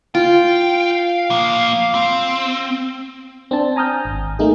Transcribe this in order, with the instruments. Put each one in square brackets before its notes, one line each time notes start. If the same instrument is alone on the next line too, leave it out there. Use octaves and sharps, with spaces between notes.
[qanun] F4 [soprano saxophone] F5 [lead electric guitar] G5
[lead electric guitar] F3 A#3
C4
[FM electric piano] C4 D4 A5
G#5 A#5 D#6 F6 G6
G#1
A3 A#3 D#4 G#4